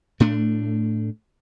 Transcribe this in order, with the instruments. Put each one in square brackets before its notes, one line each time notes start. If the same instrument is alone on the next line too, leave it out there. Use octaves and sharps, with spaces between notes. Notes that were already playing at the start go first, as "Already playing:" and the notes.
[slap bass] A2 A3 D4